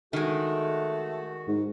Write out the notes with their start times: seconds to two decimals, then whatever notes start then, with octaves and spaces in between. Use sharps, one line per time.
0.13 D#3 G#3 A3 F#4
1.48 G#2